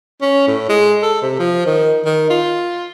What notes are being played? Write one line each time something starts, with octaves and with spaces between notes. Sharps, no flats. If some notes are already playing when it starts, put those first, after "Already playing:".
C#4
A2
G#3
A4
C3
F3
D#3
D#3
F4